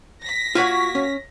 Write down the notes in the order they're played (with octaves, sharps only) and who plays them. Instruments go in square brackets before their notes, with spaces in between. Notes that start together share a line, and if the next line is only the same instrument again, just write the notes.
[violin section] A#6 B6
[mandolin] A#3 F#4 C#5 [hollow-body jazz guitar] F4 F#5
[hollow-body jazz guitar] C#4